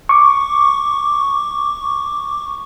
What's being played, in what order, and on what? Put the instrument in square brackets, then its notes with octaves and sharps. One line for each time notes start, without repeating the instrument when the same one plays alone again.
[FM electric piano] C#6 D6